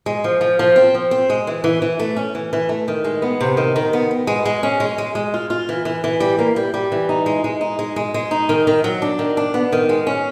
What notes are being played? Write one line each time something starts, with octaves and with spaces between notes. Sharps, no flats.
G#3
F3
F3
F3
C4
F3
C4
G#3
E3
E3
E3
A3
C#4
E3
E3
A3
D#3
G#3
B3
C3
D#3
D#3
B3
B3
G#3
G#3
C#4
G#3
G#3
G#3
F4
F4
E3
E3
E3
G3
A#3
G3
G3
E3
D#4
G#3
G#3
D#4
G#3
G#3
G#3
D#4
D#3
D#3
F#3
D4
D#3
D4
B3
D#3
G#3
C#4